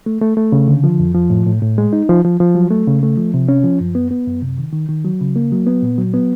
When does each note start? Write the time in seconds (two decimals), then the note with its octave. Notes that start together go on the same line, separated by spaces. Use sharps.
0.06 A3
0.21 A3
0.37 A3
0.52 C#3
0.68 D3
0.84 F3
1.00 F2
1.15 F3
1.30 A2
1.46 A2
1.62 A2
1.78 G#3
1.93 D#4
2.09 F3
2.24 F3
2.40 F3
2.55 F#3
2.71 A3
2.87 C#3
3.03 A3
3.17 F3
3.34 C3
3.49 C#4
3.64 F3
3.81 F#2
3.95 B3
4.11 B3
4.27 F#2
4.42 C3
4.59 D#3
4.73 D#3
4.89 D#3
5.05 F#3
5.21 C#3
5.36 A#3
5.52 F#3
5.67 B3
5.82 A#2
5.98 F#3
6.14 B3